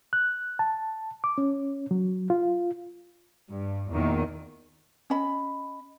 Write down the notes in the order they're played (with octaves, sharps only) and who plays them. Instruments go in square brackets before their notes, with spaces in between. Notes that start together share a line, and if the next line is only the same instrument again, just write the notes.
[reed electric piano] F#6
A5
D6
C#4
F#3
F4
[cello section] G2
E2 A#2 D#3
[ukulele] C#4 D#5 B5